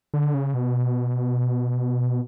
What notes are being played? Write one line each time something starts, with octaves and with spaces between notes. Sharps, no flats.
D3
C#3
B2